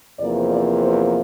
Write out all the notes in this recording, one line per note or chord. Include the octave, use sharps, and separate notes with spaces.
E2 C3 F3 A#3 D5
D5
C5